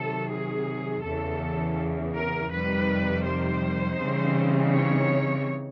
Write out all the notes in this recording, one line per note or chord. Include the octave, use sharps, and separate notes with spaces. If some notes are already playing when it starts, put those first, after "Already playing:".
Already playing: C3 D#3 F#3 A4
G#4
E2 C#3 E3 A4
A#4
F2 C3 D#3 G3 B4
C5
C#3 E3 G3 C4 D#4
C#5